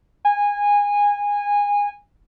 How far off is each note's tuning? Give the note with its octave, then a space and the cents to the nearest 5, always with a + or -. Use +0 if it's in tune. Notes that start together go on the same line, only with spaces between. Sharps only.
G#5 -20